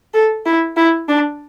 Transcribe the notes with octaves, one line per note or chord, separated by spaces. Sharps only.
A4
E4
E4
D4